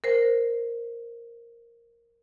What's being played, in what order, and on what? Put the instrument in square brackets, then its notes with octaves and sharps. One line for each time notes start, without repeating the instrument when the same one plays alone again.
[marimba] A#4 C5